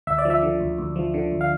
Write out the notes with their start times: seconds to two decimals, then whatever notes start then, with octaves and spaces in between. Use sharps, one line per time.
0.07 D2 E5
0.18 D5
0.25 F3
0.30 E5
0.43 D3
0.60 D2
0.78 D2
0.96 F3
1.14 D3
1.32 D2
1.41 F5